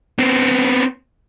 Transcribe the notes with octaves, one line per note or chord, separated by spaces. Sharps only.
B3 C4